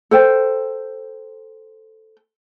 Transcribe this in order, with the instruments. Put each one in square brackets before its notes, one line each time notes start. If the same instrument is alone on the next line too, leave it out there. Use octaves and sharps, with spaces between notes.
[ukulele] A4 C5 G5